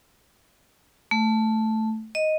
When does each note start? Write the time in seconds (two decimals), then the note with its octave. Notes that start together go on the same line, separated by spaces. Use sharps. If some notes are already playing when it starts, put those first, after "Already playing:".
1.11 A3
2.15 D#5